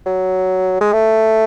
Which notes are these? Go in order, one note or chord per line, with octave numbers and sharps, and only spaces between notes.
F#3
G#3
A3